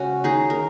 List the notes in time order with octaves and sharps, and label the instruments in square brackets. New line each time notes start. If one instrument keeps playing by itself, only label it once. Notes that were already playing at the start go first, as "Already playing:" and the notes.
Already playing: [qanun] C#3 G#3 C#4 F#4
D#3 D#4 G#4
A#4